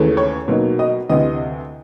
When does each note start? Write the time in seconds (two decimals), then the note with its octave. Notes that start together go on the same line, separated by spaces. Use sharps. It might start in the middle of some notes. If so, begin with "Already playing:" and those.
Already playing: D#2 C#3 E3 A3
0.17 C#5
0.48 B2 F#3 A#3 D#4
0.79 D#5
1.09 D2 C3 E3 D#5